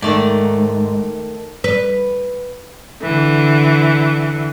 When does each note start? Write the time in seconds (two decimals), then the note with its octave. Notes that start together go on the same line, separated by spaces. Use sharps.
0.02 G#2 D#3 A3 D5
1.64 B4
3.01 D3 E3